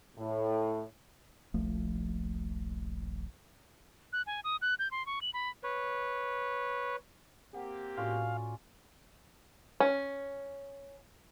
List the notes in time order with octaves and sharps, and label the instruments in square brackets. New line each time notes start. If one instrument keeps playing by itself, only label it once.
[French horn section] A2
[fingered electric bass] D#1 A#1 F3 A3
[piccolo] F#6
G#5
D#6
F#6
G6
C6
C#6
F#7
B5
[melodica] B4 C#5
[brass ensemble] A#3 C4 G4 [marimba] F#5
[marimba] A2 F#4 [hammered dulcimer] C#4 F4 D5 [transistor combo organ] F5
[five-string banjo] C#4